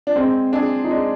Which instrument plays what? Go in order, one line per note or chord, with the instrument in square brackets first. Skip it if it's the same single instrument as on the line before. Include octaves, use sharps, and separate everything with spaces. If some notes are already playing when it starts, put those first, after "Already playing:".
[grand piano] D4
[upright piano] G#3 [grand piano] C4
[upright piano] D4 G#4
[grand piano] D#4
[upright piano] G#3 [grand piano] D4